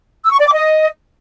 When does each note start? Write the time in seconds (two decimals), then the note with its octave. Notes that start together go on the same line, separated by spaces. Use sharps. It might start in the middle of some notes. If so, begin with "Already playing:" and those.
0.24 E6
0.32 C#6
0.39 D5
0.46 D6
0.54 D#5